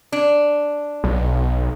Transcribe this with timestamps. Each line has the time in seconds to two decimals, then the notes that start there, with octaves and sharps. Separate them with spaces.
0.12 D4
1.04 B1